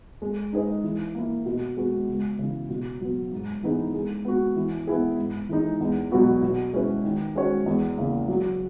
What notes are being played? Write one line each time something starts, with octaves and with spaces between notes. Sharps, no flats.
G#3
D#4 G#4 B4 D#5
E3
A#3 E4
B2
G#3 B3 F#4
C#2
C#3 E3
B2
F#3 B3
G#2
E3 B3 D#4 G#4
G#3
B3 F#4
E3
B3 E4 G#4
G#2
E3 G#3 D#4
E2
B2 F#3 B3 F#4
B2
G#3 C#4 E4 B4
D#3
G#3 C#4 F#4 C#5
E2
C#3 E3 A#3
F#3